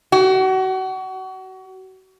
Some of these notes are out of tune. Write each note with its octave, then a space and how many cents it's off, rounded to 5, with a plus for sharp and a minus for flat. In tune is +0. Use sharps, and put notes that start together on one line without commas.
F#4 +30